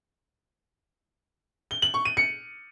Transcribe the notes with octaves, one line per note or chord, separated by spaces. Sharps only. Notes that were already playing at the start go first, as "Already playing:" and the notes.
G7
F#7
C#6
D#7
C#7